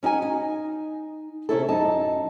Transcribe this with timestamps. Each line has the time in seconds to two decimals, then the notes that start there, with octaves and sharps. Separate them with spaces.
0.03 C#4 D#4 F#4 G#5
0.22 D#4
1.49 C3 C#4 E4 A4
1.69 F#2 D#4 A5